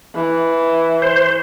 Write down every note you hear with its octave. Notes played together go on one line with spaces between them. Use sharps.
E3
C5